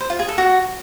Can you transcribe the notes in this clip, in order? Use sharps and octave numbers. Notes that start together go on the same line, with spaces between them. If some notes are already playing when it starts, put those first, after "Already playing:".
C5
F4
G#4
A4
F#4